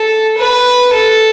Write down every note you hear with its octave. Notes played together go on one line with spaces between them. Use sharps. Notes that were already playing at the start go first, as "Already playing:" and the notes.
Already playing: A4
B4
A4